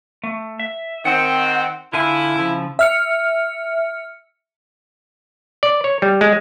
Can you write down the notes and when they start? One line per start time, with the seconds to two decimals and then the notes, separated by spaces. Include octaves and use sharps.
0.23 A3
0.59 E5
1.05 D#3 C4 F#5
1.93 D3 E4 F4 G#5
2.36 C#3 F3
2.79 E5 F6 C#7
5.63 D5
5.84 C#5
6.02 G3
6.21 G#3